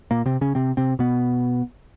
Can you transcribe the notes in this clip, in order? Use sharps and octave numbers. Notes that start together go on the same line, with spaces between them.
A#2 A#3
C3 C4
C#3 C#4
C3 C4
C3 C4
B2 B3